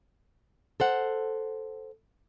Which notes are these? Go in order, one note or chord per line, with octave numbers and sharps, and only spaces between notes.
A4 C5 F#5